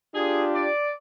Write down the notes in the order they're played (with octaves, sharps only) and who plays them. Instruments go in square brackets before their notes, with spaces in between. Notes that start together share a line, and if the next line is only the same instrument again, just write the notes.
[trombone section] D4 F4 G4 [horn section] G#4
[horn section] D5